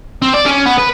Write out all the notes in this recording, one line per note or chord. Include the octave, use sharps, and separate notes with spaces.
C4
D5
C#4
B3
B4